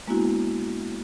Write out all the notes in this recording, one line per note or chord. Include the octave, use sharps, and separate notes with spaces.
G#3 A#3 B3 D4 E4 F#4